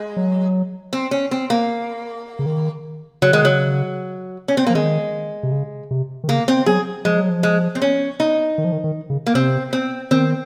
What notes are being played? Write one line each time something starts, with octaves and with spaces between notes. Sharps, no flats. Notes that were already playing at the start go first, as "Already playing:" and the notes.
Already playing: G#3
F#3
C4
C#4
C4
A#3
C#3
D#3
C#3 F#3
D#3 G#3
C#3 F#3
C#4
C4
A#3
F3
D#3 G#3
C3
C#3
C3
D#3
C#3 A#3
C4
F#3 G#4
F3 G#3
F#3
F3
G#3
C4
C#4
D#4
D#3
F3
D#3
D#3
C#3
A#3
C3 C4
C4
D#3 C4